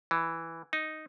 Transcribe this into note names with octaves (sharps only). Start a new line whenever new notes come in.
E3
D#4